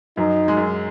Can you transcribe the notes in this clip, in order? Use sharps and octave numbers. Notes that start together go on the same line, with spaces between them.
F#2 F#3 D#4
G#3
F#2 F#3